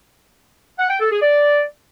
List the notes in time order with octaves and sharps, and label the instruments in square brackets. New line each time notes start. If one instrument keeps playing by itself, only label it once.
[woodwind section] F#5
G5
A4
G#4
D5